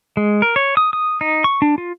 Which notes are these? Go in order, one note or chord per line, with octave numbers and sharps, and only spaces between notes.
G#3
A#4
C#5
D#6
D#6
D#4
C#6
D4
F4